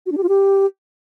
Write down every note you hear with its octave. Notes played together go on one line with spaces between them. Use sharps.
F#4
D4
G4
F4
G4